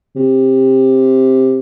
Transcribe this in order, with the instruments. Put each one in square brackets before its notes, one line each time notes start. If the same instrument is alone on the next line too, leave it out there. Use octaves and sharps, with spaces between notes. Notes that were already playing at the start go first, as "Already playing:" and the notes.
[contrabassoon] C3